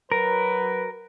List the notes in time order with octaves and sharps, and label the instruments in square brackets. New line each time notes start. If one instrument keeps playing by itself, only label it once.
[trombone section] F#3 B4 [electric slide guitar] A#4